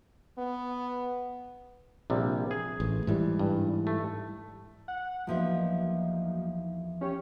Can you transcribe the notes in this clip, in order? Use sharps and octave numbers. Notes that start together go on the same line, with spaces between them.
B3
A#1 C3 G3
G#4
A1
G#2 E3 G3
G2
A3
F#5
E2 F3 F#3 A#3 D#4 E5
C#4 G4 C#5